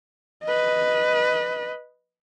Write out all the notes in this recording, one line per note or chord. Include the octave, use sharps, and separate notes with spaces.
B4 D#5